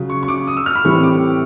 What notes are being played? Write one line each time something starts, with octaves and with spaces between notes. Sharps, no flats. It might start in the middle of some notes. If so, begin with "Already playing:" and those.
Already playing: C#3 F#3
C#6
C#6
D6
D#6
E6
F6
B5
A2 E3 G3 C4 C#6
D6